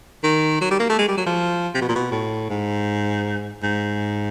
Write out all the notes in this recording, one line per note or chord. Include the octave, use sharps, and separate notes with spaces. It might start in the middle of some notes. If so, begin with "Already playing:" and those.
D#3
F#3
G3
A#3
A3
G#3
G3
F#3
F3
C3
B2
A#2
B2
A2
G#2
G#2